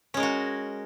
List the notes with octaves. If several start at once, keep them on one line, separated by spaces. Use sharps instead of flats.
G#3 C#4 F#4 A#4